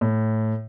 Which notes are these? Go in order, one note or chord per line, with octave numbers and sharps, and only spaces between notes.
A2